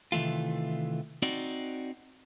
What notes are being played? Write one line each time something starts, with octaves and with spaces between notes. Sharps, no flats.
C3 D#3 E3 A3 F4
C4 D#4 F#4 D5